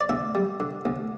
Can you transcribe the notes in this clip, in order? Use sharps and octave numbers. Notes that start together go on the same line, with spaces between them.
D5
D2 E5
G3
D3
D2